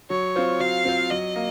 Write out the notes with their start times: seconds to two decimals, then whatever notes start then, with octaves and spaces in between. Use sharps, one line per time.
0.10 F#3 C#5
0.36 C4 F4 C5
0.60 F#3 F5
0.85 C4 F4 C5
1.10 F#3 D#5
1.36 A#3